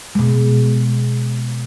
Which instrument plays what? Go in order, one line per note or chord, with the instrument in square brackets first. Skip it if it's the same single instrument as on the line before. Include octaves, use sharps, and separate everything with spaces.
[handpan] B2 G#3